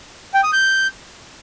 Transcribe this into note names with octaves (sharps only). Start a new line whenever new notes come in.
G5
D#6
G6